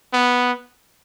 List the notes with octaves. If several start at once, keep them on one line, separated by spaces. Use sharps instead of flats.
B3